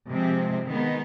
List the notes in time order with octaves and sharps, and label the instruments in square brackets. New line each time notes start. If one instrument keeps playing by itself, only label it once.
[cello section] C3 F3 G#3 C4
D#3 G#3 B3 D#4